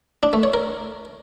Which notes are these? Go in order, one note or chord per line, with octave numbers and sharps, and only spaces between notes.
D4
A3
C#5
A#4